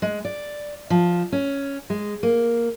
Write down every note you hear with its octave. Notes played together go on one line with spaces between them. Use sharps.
G#3
D5
F3
C#4
G#3
A#3